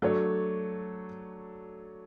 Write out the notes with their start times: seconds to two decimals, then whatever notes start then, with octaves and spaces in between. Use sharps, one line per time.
0.02 F#3 A3 D4 A4 C#5